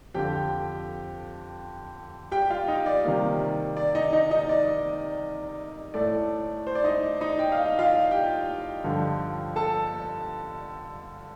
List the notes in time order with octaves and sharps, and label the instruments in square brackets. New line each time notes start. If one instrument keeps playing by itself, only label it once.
[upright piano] F2 D3 F3 G4 G5
G4 G5
F4 F5
D#4 D#5
D5
C3 D#3 G3 A#3
D5
D#4 D#5
D#4 D#5
D#4 D#5
D5
A2 A3 D5
C5
D5
D#4 D#5
D#4 D#5
G5
F5
D#5
F4 F5
G4 G5
G2 D3 F3
A4 A5